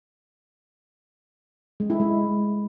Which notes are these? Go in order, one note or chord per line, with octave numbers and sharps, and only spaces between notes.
G#3
E4
G#3